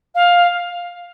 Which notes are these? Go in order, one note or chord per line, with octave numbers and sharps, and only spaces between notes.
F5